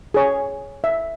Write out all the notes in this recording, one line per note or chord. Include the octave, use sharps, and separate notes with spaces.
G#4 C#5
E5